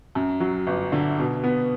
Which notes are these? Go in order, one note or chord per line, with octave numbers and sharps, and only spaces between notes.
F#2
F#3
G1
D3
B2
B3